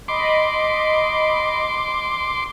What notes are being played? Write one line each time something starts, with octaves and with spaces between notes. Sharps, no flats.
D#5 B5 C6 D6